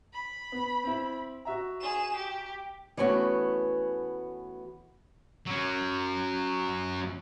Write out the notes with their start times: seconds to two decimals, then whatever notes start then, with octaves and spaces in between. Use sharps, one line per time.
0.13 B5
0.52 B3
0.83 C4 E4
1.45 F#4 E5 A#5
1.81 G#4 E7
2.16 G4
2.97 E3 A3 B3 C#4 F#4
5.47 F#3 C#4